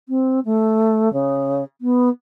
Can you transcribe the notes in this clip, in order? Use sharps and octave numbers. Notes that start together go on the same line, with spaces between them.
C4
A3
C#3
B3